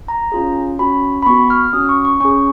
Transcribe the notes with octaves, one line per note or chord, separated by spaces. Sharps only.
A#5
C#4 F4 G#4
C#4 F#4 B5
B5
B3 F#4 C#6
F6
C#4 F#4 D#6
C#6
C#6
C#4 G#4 C#6